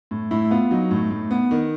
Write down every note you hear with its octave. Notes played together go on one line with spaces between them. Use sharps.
A2
A2 E4
B3 F4
F#3 D#4
A2
A2
B3
D#3